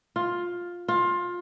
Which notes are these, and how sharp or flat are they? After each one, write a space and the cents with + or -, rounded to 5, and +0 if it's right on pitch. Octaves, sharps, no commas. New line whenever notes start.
F4 +10
F4 +20